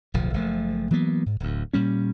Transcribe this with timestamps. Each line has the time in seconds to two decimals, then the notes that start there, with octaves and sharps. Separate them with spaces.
0.14 D1 B1 F3
0.33 F#1 F3 A3
0.91 E3 F#3 A#3 B3
1.26 G#2
1.40 D1 D2
1.73 A#2 G3 C#4